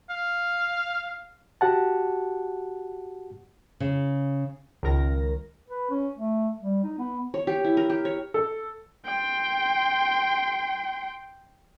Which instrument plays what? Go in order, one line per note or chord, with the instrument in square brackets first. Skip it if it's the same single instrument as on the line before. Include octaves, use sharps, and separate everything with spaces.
[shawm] F5
[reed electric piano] F#4 G4 F#5 A5
[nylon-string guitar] C#3
[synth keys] C#2 D#3 A#4 A#6
[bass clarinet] B4
C#4
A3
G3
D#4
B3
[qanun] C#5
G4
E4
A#4
G4
C#5
[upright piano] A4
[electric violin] G5 C6